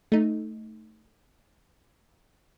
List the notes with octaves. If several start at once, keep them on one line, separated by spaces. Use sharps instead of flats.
A3 D#4